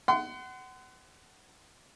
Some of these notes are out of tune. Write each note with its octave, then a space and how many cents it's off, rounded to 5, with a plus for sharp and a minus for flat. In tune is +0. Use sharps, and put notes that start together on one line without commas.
F#5 +25 C6 -30